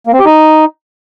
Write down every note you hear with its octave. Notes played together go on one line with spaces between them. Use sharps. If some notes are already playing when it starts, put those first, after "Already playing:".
A#3
C4
G4
D#4